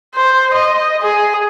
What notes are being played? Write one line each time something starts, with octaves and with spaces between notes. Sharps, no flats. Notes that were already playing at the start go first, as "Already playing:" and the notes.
C5
D#5
G#4